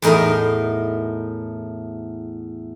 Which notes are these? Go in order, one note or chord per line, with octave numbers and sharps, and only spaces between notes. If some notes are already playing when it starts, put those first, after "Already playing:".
E2 A2 D#4 A#4 D#5